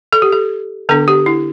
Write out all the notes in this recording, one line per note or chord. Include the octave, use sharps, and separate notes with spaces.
A4
G4
A4
D3 B3 D4 A4
G4
E4